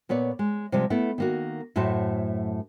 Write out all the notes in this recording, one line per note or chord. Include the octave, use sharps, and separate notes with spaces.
A#2 B3 B4 C#5 D5
G#3
C3 F3 G3 G#3
A3 B3 E4
D#3 A#3 F#4
F#2 A2 A3 F#4 C5 A5